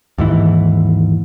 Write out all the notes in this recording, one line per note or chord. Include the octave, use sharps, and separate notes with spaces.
D#2 G#2 E3